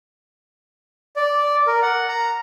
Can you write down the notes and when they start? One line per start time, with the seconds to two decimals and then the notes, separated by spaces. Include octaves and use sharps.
1.16 D5
1.67 A#4
1.82 F#5
2.09 A#5